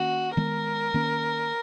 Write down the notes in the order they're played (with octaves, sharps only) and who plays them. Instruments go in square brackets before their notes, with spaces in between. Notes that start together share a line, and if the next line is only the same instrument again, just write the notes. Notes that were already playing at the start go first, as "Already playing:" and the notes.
Already playing: [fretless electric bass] D#3 A#3 C#4 [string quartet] F#4
[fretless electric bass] D#3 G#3 B3 [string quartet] A#4
[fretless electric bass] D#3 A#3 C#4